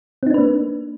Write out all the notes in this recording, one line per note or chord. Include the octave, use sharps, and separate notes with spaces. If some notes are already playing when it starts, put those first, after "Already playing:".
A#3 C4 D4 D#4 B4